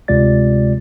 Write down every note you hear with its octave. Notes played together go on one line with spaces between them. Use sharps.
D2 C3 G#3 F4 D5 A6